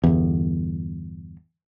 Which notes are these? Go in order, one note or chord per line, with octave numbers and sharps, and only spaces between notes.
G1 E2